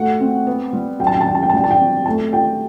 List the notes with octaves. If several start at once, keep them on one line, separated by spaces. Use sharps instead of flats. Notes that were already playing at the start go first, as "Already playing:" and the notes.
Already playing: A3 F#4 F#5
C4
B3
G3
F#3 G5
A5
G5
A5
F#4 G5
A5
G5
A5
G3 G5
A5
G5
C4
A3 A5
G4 G5